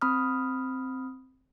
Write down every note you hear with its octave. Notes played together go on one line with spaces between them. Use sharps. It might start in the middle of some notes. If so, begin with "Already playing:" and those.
C4 B5 D#6 F6